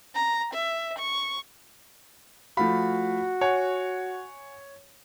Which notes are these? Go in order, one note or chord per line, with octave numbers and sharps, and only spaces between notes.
A#5
E5
C#6
F3 A3 F#4 F5 B5
C#5 F#5 G#5